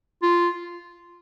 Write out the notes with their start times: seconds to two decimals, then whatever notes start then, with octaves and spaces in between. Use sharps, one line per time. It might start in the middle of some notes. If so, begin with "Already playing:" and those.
0.22 F4